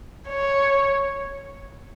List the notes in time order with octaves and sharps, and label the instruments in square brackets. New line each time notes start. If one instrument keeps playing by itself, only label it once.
[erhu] C#5